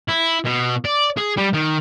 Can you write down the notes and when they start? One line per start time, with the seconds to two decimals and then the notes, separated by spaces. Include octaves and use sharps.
0.09 E4
0.45 B2
0.85 D5
1.17 G#4
1.37 G3
1.53 D#3